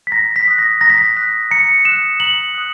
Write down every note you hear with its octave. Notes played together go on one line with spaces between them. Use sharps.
B6
A#5 A#6
B6
D#6 F#6
A#6
A#5 A#6
B6
A#6
D#6 F#6 B6
A#5 C#7
D#6 F#6 E7
A#5 F#7
D#6 F#6